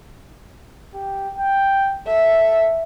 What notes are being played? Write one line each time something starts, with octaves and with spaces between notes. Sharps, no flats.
G4
G5
A4 E5